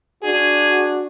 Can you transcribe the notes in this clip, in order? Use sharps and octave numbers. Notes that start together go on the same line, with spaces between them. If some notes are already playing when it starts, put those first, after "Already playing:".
D4 F#4 G#4